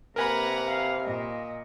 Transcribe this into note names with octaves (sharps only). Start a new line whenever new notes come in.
C3 A#3 A#4 B4 F#5 G#5 A#5 B5
F5
A#2 D#5